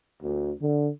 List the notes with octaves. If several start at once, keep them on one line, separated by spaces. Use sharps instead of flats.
D2
D3